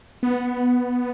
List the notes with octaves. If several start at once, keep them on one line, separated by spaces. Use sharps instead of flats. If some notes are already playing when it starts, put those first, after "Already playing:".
B3